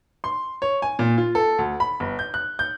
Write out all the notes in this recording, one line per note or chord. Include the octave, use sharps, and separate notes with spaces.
C6
C#5
G#5
A#2
F4
A4
D2
B5
G1
G6
F#6
G6